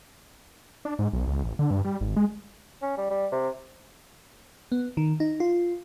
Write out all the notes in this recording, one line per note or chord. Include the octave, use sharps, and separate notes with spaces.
D4
G#2
B1
C#2
A1
D3
G2
G3
G#1
G#3
C#4
G3
G3
C3
B3
D#3
D#4
F4